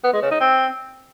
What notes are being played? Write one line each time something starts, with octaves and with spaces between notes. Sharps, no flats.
B3
G#3
C#3
D#4
C4